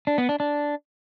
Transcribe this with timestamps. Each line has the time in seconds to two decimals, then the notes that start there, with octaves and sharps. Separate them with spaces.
0.07 D4
0.18 B3
0.29 D4
0.40 D4